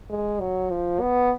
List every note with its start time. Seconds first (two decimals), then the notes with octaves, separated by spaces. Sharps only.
0.10 G#3
0.40 F#3
0.70 F3
1.00 B3